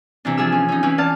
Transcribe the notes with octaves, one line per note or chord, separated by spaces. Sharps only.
C3 E3 D4
E3 F3 G#4 E6
C#4
C#4 D#4
E3 C#4 E4
D5 F5 A5